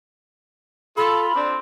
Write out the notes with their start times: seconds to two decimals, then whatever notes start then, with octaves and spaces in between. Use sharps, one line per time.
0.97 F4 A4 B5
1.35 C4 D4